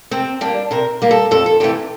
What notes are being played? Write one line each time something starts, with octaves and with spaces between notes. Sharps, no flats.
C3 C4
G3 A#3 D4
C3 A#4
G3 A#3
A4
F2 A4
A4
C3 E3 A3 G4